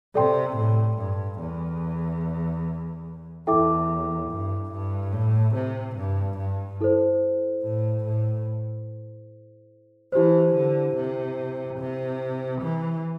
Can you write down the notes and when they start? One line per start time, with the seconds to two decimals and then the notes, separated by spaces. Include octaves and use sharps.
0.15 C3 A4 D5 G5 C6
0.57 A2
0.98 G2
1.40 E2
3.47 E2 E4 A4 E5 G5 D6
4.30 G2
4.72 G2
5.13 A2
5.55 C3
5.97 G2
6.38 G2
6.81 E4 A4 C5
7.64 A2
8.05 A2
10.12 E3 E4 G4 C5
10.55 D3
10.95 C3
11.79 C3
12.62 E3